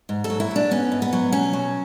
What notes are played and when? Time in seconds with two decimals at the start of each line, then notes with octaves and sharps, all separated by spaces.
0.09 G#2
0.24 A4
0.30 F#3
0.40 E4
0.51 G#2 D4
0.71 B3 C#4
0.92 G#2
1.02 B3
1.13 F#3
1.32 B2 C#4
1.53 F#3